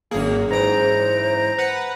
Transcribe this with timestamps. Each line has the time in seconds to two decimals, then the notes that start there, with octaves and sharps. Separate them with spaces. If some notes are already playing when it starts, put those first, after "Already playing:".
0.11 G#1 F#2 A#3 G#4
0.50 G#2 E3 C5 A#5 D7
1.58 B4 F#5